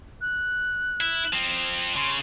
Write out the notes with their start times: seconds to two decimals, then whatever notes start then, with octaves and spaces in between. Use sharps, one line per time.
0.21 F#6
1.01 E4
1.33 F3 C4
1.96 C#3 C6